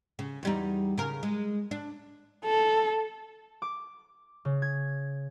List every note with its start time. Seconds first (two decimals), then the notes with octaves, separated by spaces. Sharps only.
0.19 C#3
0.43 E2 G3 D#4
0.98 C#3 A#4
1.23 G#3
1.71 D4
2.45 A4
3.62 D6
4.45 C#3
4.62 G#6